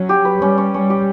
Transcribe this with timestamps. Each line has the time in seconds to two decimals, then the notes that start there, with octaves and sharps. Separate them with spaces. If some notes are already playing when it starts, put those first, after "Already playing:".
Already playing: F#3 C#4
0.09 G4
0.25 B4
0.41 G3 C#4
0.58 C#4
0.74 G3 C#4
0.90 G4